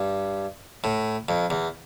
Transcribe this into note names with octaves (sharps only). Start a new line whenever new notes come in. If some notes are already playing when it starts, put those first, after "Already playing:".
Already playing: G2
A2
F2
E2